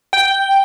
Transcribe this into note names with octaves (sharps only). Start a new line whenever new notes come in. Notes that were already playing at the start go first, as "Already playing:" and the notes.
G5